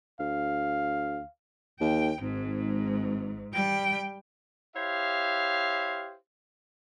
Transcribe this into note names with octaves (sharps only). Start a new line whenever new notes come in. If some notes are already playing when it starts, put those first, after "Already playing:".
D2 F5
D#2 G5
G#1 G#2
G3 G5
E4 G4 C5 C#5 E5 F5